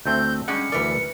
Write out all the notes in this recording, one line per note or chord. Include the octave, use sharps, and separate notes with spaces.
D2 A3 C4 G6
G3 G#3 C#4 F#5 C#7
D2 E3 A#4 B4 D5